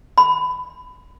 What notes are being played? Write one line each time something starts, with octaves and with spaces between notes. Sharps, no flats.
B5